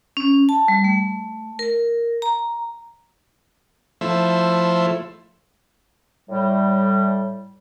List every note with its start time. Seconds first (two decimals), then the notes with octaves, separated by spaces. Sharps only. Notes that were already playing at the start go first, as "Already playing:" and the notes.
0.17 C#4
0.49 A5
0.68 G3
0.84 A3
1.59 A#4
2.22 A#5
4.01 F3 A3 E4 C5
6.29 A2 G3